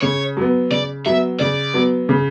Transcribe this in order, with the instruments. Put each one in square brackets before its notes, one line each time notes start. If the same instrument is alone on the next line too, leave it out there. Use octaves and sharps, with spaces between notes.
[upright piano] C#3 [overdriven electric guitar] C#5
[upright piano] F#3 B3
[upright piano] C#3 [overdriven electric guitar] D5
[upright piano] F#3 B3 [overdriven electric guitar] E5
[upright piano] C#3 [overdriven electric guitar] D5
[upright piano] F#3 B3
C#3